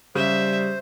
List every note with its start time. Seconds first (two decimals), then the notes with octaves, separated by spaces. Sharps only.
0.16 C#3 G3 C5 E5